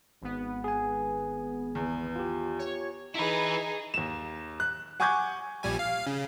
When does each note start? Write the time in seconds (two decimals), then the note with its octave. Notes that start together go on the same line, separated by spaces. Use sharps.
0.21 G#1 B3
0.64 G#4 G#5
1.75 E2
2.16 F4 G4
2.59 C#5
3.15 D#4 E4 G#4 B4
3.94 D#2 E7
4.60 F#6
5.00 F#5 G#5 C#6 D6 G6 G#6
5.63 A#1 G3 G#5
5.79 F5
6.07 C#3